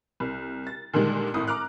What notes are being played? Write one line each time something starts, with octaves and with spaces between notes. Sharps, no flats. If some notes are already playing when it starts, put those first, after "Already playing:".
C2
A6
A#2 D3 D#3 G3 G#3
G#1 A2 D#6
A#5 D6 F6 F#6